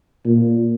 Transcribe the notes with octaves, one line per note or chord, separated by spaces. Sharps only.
A#2